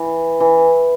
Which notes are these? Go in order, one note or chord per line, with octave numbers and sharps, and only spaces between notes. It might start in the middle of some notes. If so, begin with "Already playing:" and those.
Already playing: E3
E3